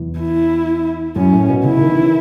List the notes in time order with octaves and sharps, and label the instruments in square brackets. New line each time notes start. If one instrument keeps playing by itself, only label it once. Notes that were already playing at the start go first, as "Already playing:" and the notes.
Already playing: [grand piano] E2
[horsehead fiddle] E4
[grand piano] F#2 [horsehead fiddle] C#4
[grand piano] A2
B2
[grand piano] C#3 [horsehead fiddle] E4
[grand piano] D#3
E3